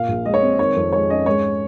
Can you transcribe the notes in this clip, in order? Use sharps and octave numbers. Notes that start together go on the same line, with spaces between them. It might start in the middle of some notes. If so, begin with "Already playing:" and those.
Already playing: A#2 F5
A#1
G#3 D#5
C#5
C4
D#3 C#5
F2
G#3 C#5
C#4 D#5
G#2 C#5